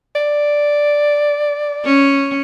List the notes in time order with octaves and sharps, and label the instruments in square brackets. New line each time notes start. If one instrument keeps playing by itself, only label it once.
[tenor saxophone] D5
[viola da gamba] C#4